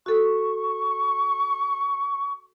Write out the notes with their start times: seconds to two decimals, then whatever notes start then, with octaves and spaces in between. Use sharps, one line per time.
0.06 F#4 A4 C#6